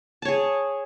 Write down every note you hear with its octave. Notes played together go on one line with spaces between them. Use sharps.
G#4 C#5 A5